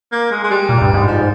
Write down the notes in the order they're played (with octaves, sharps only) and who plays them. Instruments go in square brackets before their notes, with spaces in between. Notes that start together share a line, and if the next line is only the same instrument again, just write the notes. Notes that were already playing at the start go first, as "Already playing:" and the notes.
[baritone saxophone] A#3
G#3
G#3
G3
[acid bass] A#2
G2
G#2
[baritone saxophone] F3